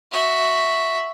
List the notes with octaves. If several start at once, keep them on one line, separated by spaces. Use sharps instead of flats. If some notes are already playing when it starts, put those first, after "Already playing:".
F#4 E5